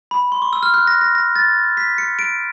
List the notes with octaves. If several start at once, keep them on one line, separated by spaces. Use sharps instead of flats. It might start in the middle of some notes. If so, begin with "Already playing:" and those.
B5
C6
C#6
E6
F6
F#6
A#6
A#6
A#6
A6
B6
C#7
D7